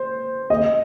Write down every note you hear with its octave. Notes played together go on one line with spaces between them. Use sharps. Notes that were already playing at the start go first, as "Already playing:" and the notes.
Already playing: C5
D#5